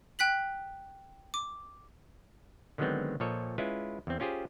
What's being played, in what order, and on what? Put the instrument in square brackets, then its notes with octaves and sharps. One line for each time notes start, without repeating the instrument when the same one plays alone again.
[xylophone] G5 F#6 B6 F#7
D6
[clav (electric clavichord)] D3 D#3 F#3 G#3 B3 C4
A#2 F3 A4 C#5 D#5
G#3 C#4 E4 F4 B4
E2 C4
C#4 F4 G4 G#4 C5